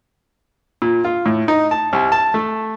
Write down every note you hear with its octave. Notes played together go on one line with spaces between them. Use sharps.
A#2
F4
A2
D#4
A5
C2
A5
A3